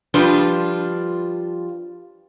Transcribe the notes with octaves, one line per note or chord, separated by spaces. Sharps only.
F3 G3 D4 F4 B4